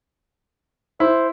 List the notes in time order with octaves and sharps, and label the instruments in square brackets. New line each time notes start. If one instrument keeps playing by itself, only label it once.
[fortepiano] E4 [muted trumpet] C5